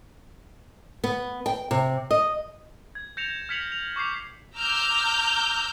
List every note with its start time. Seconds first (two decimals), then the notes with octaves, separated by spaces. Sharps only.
1.04 B3
1.46 G5
1.71 C3
2.11 D#5
2.95 G#6
3.17 G6 A#6 C#7 E7 F7
3.49 F6 G#6 B6 C#7 F7 F#7
3.72 F7
3.96 C#6 D6 G6 C7 F7
4.56 A#5 D6 E6 F6 G6